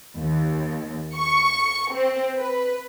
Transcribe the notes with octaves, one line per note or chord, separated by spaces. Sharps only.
D#2
C#6
C4
B4